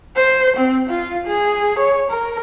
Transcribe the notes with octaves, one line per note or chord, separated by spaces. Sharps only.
C5
C4
F4
G#4
C#5
A#4